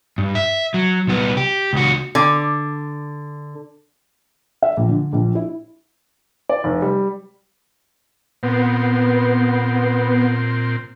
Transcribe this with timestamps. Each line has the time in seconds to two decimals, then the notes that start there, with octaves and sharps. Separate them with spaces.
0.18 G2
0.35 E5
0.74 F#3
1.07 C2 B3
1.37 G4
1.73 C#2 F#4
2.15 D3
4.62 E5
4.77 A#1
4.89 D3
5.13 A#1
5.35 E4
6.49 D5
6.64 F1
6.82 G3
8.43 A#2 B3 C4